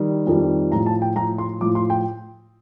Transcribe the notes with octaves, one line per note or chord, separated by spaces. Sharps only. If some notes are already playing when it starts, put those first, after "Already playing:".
Already playing: D#3 G3
F2 D#3 G3
A2 F3 A#5
A5
G5
A2 F3 A#5
C6
A2 F3 D6
C6
G5